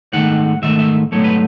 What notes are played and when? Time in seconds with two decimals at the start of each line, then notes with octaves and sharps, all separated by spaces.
0.13 G#2 D#3 A3 F#5
0.62 G#2 D#3 A3 E5
0.79 E5
1.12 G#2 F#3 A3 C#5
1.24 B4